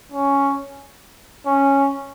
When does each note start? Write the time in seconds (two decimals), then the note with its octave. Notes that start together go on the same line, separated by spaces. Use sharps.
0.12 C#4
1.46 C#4